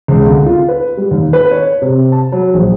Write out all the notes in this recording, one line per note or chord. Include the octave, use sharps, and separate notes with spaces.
C#2
D2
F4
B4
G3
D#2
B4
C#5
C3
A5
F#3
A#1